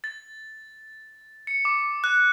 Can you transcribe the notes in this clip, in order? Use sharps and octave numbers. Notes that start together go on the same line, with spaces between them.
A6
C#7
D6
F#6